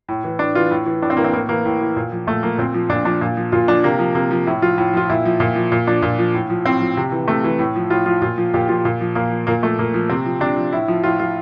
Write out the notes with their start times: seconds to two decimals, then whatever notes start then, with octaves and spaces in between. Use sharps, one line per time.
0.09 A2
0.24 E3
0.39 A2 D4
0.55 E3 F4
0.71 A2
0.86 E3
1.02 A2 D4
1.10 C4
1.17 E3 A#3
1.24 C4
1.33 A2 A#3
1.49 E3 A#3
1.66 A2
1.81 E3
1.96 A#2
2.12 F3
2.27 A#2 A3
2.43 F3 A#3
2.58 A#2 C4
2.74 F3
2.89 A#2 D4
3.05 F3 D4
3.21 A#2
3.37 F3
3.52 A#2 F4
3.68 F3 D4
3.84 C3 A#3
3.99 F3
4.15 C3 A#3
4.31 F3
4.46 A2 E4
4.62 F3 F4
4.78 A2
4.94 F3 F4
5.10 A#2 E4
5.25 F3
5.40 A#2
5.56 F3
5.72 A#2
5.87 F3 D4
6.02 A#2
6.19 F3
6.34 A2
6.50 F3
6.65 A2 C4
6.81 F3
6.97 C3
7.12 E3
7.28 C3 A3
7.44 E3
7.59 A2
7.76 F3
7.90 A2 F4
8.06 F3 F4
8.22 A#2 F4
8.38 F3
8.54 A#2 G4
8.69 F3 F4
8.85 A#2
9.01 F3
9.15 A#2 A#3
9.32 F3
9.47 A#2 A#3
9.62 F3 A3
9.79 A#2 A#3
9.94 F3
10.09 C3 C4
10.26 F3
10.40 C3 D4
10.56 F3
10.73 A2 E4
10.88 F3
11.04 A2 F4
11.19 F3 F4